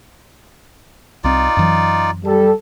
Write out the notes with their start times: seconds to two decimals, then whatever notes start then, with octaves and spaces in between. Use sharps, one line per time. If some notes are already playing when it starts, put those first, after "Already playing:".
1.24 C2 C4 D#4 F4 D5
1.57 F#2 E3 F#3
2.24 G3 A4